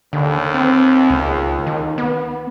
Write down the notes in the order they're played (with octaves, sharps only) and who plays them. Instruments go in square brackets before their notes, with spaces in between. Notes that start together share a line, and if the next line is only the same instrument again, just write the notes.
[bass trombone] D#2 [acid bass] D3
[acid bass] C4
C#2
D#3
B3